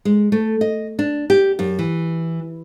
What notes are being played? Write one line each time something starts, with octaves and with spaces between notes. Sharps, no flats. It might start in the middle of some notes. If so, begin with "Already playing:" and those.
G#3
A3
D#5
D4
G4
F#2
E3